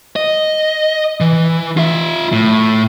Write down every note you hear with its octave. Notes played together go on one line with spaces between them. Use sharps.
D#5
E3
F4 E5
A2